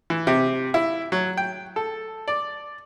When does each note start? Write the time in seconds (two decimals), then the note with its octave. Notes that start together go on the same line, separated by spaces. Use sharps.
0.10 E3
0.27 C3
0.74 E4
1.12 F#3
1.37 G5
1.76 A4
2.28 D5